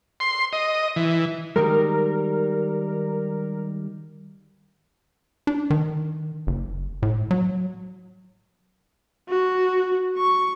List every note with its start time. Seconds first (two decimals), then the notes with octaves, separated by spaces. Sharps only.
0.20 C6
0.53 D#5
0.96 E3
1.56 D#3 G3 G#3 A#4
5.47 D4
5.70 D#3
6.47 F#1
7.02 A2
7.31 F#3
9.29 F#4
10.17 C#6